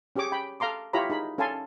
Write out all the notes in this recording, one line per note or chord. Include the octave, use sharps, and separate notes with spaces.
C#4 G4 G#4 C#5 D6
G5 B5
A4 F5 A#5 C6 D6
E4 F4 G4 C#5 A#5 B5
D#4 G#4 B5
C#4 A4 F5 G#5 A5 C6